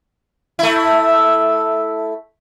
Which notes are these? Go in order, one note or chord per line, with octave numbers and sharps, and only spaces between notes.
A3 E4